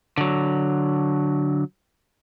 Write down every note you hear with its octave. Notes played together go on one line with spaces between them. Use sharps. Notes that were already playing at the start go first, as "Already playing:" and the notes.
D3 F#3